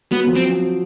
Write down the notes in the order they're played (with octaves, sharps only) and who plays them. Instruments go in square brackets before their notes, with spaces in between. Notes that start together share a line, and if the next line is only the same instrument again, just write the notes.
[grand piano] F#3 F#4 [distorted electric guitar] B3
[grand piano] F3 F4
[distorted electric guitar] C4